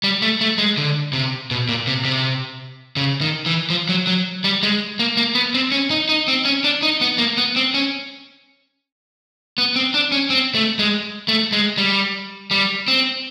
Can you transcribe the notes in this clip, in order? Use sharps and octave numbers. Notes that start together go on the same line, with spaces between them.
G3
A3
A3
G#3
D3
C3
B2
A#2
C3
C3
C#3
D#3
E3
F3
F#3
F#3
G3
G#3
A#3
A#3
B3
C4
C#4
D#4
D#4
C4
C#4
D4
D#4
B3
A#3
B3
C4
C#4
B3
C4
D4
C#4
C4
A3
G#3
A3
G#3
G3
G3
C4